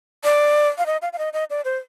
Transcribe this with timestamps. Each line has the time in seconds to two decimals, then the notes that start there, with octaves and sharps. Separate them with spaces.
0.24 D5
0.78 F5
0.86 D#5
1.02 F5
1.13 F5
1.18 D#5
1.33 D#5
1.50 D5
1.65 C5